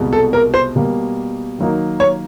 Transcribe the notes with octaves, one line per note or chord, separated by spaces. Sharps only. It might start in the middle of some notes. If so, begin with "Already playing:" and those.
Already playing: C2 B2 G#3
A4
A#4
C5
B2 G3 A#3
D#3 F#3 A#3 D#4
C#5